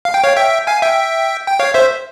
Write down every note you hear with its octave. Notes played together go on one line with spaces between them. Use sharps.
F5
G5
C#5 F5
E5 G5
F5 G#5
E5 G5
G5
C#5 F5
C5 E5